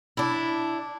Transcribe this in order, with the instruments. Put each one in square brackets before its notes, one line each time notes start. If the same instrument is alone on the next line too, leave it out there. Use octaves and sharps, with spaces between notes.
[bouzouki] D4 E4